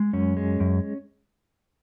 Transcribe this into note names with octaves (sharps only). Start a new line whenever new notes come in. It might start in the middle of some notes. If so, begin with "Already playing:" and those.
Already playing: G#3
F#2 C#4
G#3
F#2